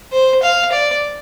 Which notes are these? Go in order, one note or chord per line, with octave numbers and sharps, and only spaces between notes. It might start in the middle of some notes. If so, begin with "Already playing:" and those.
C5
F5
D5